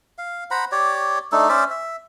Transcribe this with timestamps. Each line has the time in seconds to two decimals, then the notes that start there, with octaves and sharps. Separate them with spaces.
0.18 F5
0.51 C5 F#5 A#5 B5
0.72 G4 C#5 D5
1.32 A3 D4 D#4 A4
1.49 C#4 C5 D5 E5
1.70 E5